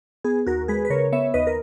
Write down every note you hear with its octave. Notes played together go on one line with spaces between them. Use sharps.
B3 G#4
D#2 F#4 A#4
G#3 G#4 B4
B4
C#3 A#4 C#5
B3 C#5 E5
D#2 B4 D#5
A#4